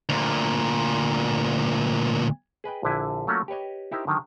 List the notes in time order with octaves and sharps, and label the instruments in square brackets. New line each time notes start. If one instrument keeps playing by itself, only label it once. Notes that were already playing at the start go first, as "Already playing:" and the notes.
[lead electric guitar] D2 A#2
[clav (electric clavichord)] G#4 B4 D#5 G5
A#1 D3 E4 G#5
F#3 A3 A#3 C#4 F4 F#4
G4 B4 C#5 D#5
D#4 E4 G4 A#4 C5
D3 D#3 F#3